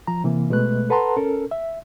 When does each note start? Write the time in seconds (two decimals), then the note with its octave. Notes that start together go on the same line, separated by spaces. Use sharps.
0.07 F3 A#5
0.24 C3 E3 A#3
0.50 B2 G#3 A3 B4 F#6
0.90 A4 B4 F#5 A5 A#5 C6
1.16 C#4 A4 A#4
1.51 E5